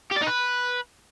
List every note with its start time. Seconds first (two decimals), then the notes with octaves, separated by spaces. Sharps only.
0.11 G4
0.17 D5
0.22 D#4
0.27 B4